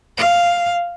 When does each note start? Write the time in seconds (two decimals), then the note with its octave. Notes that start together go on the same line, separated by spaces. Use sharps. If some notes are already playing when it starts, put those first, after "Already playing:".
0.17 F5